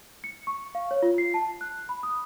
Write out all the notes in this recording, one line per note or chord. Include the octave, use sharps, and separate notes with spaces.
C#7
C#6
F5
C#5
F4
C7
A5
F#6
B5
D#6